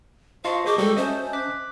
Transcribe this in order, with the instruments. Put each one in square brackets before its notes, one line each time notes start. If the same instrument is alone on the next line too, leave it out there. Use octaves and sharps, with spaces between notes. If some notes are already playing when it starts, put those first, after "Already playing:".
[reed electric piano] F4 C6 C#6 [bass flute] C5 [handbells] D#5 A5 [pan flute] F5
[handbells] F#4 C#6 G6 [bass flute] G#4 [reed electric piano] A#4 C5 D#5 [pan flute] D6
[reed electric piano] G3 G5 [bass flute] G#3 [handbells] F#4 [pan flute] A4
[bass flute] C#4 [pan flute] C5 [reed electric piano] D#5 E5 A5
[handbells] D6 F#6 B6